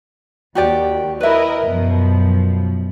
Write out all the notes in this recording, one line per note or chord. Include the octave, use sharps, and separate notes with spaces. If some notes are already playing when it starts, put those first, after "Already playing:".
D#2 F#4 G4 D5
E4 A#4 B4 D#5 E5
F#2 B2 F3